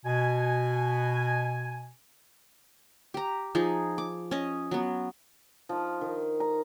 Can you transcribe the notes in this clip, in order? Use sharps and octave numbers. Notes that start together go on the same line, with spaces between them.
B2 G#5
G4 A#5
F3 D#4 G#4
D6
C#4 D#5
F#3 B3
F3 D#4
D#3
A#5